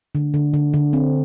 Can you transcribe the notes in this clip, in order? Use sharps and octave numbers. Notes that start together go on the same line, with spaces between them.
D3
D3
D3
D3
C4